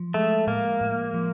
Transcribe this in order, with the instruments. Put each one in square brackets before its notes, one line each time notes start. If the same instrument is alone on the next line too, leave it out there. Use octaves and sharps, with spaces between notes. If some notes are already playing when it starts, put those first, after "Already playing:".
Already playing: [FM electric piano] F3
[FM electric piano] G#3 [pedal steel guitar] A3
[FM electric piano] A2 [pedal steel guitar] A#3
[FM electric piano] A2
F3